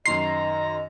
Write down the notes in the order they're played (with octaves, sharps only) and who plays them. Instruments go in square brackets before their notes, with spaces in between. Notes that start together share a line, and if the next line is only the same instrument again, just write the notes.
[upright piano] F#2 D#3 C6 [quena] D#5 [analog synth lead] A#5 [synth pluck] C7